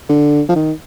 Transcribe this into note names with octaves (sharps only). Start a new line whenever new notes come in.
D3
F3
D#3